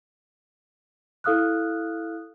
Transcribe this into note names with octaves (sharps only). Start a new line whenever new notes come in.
E4 A4 F5 D#6 F6 F#6